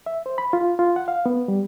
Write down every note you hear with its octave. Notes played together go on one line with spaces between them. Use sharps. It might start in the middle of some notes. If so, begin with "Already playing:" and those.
E5
C5
B5
F4
F4
F#5
F5
B3
G3